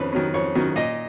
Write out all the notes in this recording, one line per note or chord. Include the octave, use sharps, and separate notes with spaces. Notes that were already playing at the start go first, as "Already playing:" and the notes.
Already playing: F2 D#3 C#4 B4 C#5
D#3 F#3 C#4
F2 C#5
D#3 F#3 C#4
A#2 D#5